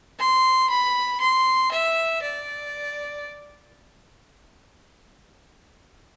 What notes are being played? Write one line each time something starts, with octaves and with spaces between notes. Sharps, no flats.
C6
B5
C6
E5
D5